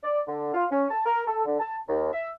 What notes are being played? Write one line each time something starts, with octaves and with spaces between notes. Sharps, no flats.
D5
D3
F4
C#4
A5
A#4
A4
D3
A5
D#2
E5